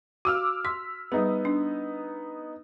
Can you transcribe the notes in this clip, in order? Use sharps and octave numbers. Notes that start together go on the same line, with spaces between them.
F#4 F5 D6 E6 F6
C6 B6
G3 B3 D#4 G#4
D4